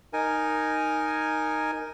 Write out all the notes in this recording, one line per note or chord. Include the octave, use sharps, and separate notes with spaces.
D#4 A#4 G#5